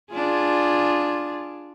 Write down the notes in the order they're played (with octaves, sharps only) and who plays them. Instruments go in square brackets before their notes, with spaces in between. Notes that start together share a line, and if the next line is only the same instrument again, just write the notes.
[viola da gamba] D4 F4 G#4